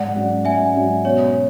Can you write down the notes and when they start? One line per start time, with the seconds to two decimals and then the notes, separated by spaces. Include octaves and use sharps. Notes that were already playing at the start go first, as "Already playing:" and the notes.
Already playing: G#2 D5 F#5
0.15 F#3 C#4
0.45 G#2 E5 G#5
0.75 F#3 C#4
1.05 B2 C#5